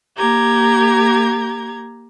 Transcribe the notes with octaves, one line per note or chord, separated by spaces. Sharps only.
A#3 G4 A#5 G#6